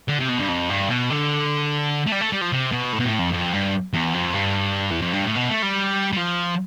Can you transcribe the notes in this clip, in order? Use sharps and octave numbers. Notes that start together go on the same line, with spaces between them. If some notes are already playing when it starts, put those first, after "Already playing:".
D3
C3
B2
G2
F2
G2
B2
D3
A3
G3
A3
G3
F3
C3
B2
A2
B2
A2
F2
F2
G2
E2
F2
G2
E2
F2
G2
A2
B2
A3
G3
G3
F3